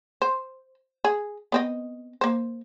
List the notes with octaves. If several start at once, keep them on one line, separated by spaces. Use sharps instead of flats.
C5
G#4
B3 C4 D#5
A#3 C5